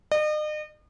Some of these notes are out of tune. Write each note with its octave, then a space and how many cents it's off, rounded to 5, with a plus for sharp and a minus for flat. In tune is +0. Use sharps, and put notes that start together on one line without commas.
D#5 -40